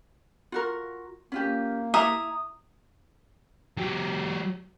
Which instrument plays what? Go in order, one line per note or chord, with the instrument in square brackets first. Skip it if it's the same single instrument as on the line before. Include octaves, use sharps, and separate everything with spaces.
[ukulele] F4 F#4 A#4
[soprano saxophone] A#3 [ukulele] C#4 F4 G4
[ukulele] E4 E5 A#5 [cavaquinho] D#6
[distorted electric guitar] F#3 G4